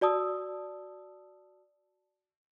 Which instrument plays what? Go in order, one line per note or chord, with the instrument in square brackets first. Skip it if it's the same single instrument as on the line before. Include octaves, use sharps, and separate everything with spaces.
[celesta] F#4 D5 A5 D#6 E6